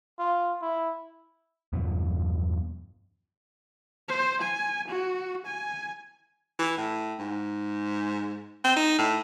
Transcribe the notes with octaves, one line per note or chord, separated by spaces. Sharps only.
F4
E4
E2 G2 B2 F3
C5
G#5
F#4
G#5
E3
A2
G#2
C4
D#4
A2